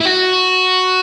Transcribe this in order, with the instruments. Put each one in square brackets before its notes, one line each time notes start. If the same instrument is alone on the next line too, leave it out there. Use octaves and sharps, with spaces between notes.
[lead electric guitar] E4
F#4